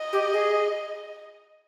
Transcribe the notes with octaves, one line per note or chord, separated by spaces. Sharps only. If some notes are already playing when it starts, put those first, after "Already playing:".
Already playing: D#5
G4
G#4